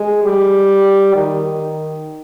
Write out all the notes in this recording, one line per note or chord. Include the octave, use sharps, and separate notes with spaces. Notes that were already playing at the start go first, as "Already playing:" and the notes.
Already playing: G#3
G3
D#3